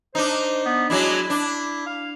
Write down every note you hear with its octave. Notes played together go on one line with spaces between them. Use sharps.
D4 D#4 C5
B3
F#3 G#3 D4 E4
D4
F5